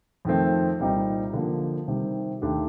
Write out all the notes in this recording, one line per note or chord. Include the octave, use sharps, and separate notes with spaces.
F2 D#3 A3 C4
C2 A#2 G3 C4 D#4
D3 F3 A#3
C3 D#3 G3 C4
D#2 D#3 A3 D4 G4